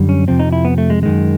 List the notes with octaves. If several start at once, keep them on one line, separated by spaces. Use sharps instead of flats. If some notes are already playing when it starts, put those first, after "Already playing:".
Already playing: F#2 D3 G3
C#4
F2 C3 F3 C4
D#4
E4
B3
A3
G#3
F#2 D#3 G#3